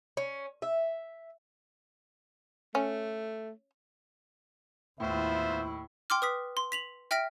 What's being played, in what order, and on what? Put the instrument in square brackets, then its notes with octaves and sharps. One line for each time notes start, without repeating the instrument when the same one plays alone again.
[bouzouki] C#4
E5
[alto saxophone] A3 [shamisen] C#4
[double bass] D#2 E4 [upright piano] A2 [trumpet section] B3 F4 C5 [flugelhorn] E5
[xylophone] G5 C6 D6 F6
B4 D#6 B6
C6
B6 F7 F#7
E5 G5 F6 A#6 B6 D7